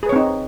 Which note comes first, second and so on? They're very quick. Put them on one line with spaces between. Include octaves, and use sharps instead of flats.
G#4 B4 C#5 C4 D#4